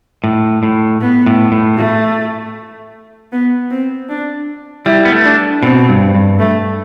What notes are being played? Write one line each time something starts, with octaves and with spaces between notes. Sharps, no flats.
A2
A2
B3
A2
A2
A3
B3
C4
D4
G3 E4
B3
A3
D4
B2 C4
G2
G2
A3